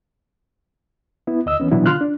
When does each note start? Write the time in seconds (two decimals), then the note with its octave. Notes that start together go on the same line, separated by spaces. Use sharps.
1.27 B3 E4
1.46 D2 D#5 E6
1.60 E3 B3 C#4
1.71 B2 E3 F#3 B3 D4 E4
1.86 D3 F4 C6 F6 F#6
2.01 D4